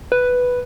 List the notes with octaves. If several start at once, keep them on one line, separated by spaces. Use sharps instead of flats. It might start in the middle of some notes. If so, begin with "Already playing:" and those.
B4